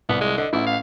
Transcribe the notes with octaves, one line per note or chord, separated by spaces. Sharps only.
C2 B3
G#3
D3 D#5
A1 E4
F5